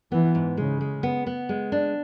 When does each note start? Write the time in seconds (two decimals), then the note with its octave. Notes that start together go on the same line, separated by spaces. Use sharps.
0.12 E3 B3
0.35 G#2
0.57 C#3 G#3
0.81 G#3
1.03 B3
1.26 B3
1.49 G#3
1.72 D4